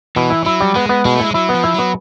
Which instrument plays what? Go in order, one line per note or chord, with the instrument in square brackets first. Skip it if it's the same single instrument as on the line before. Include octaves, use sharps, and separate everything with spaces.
[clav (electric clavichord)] B2 [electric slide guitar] E3
[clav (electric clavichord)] E4
[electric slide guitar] F#3 [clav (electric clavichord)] E4
[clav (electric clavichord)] G3
[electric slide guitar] G#3 [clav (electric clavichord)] B3
[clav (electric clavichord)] B3
[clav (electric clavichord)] B2 [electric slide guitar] G#3
[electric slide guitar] A3
[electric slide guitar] G#3 [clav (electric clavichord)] E4
[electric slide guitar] F#3 [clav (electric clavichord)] E4
[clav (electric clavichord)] B3
[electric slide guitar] F3
[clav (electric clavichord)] E4
[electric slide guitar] F#3 [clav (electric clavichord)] B3